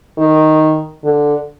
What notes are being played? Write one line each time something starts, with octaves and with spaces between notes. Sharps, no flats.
D#3
D3